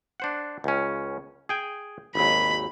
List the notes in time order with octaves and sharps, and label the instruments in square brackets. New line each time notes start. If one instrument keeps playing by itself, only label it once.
[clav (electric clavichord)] D4 C5 F#5
C#2 C#4
G#4 G5 G#5
[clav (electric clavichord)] G#1 D#2 [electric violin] B5